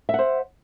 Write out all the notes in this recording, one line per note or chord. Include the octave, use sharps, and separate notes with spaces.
C5 E5 F#5